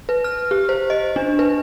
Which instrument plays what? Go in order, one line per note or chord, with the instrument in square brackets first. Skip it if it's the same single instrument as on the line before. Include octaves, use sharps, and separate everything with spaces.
[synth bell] B4
F6
G4
C5
D#5
D4
B4